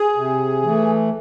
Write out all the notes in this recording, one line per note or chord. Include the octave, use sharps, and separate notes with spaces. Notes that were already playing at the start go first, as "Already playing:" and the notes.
Already playing: G#4
C3
E3 A3